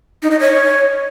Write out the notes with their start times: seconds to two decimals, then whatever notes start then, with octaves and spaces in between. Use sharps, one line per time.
0.22 D#4
0.31 D#5
0.40 C#5